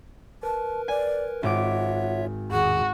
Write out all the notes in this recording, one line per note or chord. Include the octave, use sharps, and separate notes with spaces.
A#4 B4 A5
D5 G#5
G#1 F4 C#5 E5 F#5 D6
E2 A2 D#3 F#4 G#4